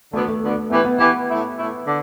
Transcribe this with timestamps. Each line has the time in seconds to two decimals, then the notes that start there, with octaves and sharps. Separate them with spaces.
0.13 D2 D3 A3 B3 D4
0.28 A3
0.42 D2 D3 B3 D4
0.70 E3 A3 B3 G4 B4
0.84 B3
0.99 E3 A3 B3 G4 B4
1.28 A2 A3 E4
1.56 A2 A3 E4
1.87 D3